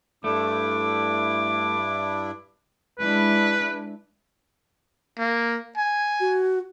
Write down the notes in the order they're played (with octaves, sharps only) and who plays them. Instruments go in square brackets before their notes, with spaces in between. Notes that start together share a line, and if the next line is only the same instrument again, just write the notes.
[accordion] G2 D4 E4 [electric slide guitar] A3 [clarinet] D6
[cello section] G#3 D4 E4 [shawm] B4
[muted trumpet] A#3
G#5
[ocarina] F#4